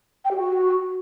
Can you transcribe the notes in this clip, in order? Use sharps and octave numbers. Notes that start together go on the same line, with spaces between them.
G5
G4
F#4